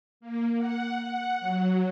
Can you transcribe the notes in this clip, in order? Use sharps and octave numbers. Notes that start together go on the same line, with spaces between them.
A#3
F#5
F#5
F#3